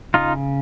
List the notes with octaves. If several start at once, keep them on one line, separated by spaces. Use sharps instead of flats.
C#3 D#4 F4